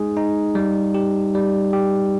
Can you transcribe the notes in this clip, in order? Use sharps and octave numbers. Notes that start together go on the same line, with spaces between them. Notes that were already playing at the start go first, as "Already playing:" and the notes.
Already playing: G#3 D#4 G#4
D#4
G3
G4
G3
G4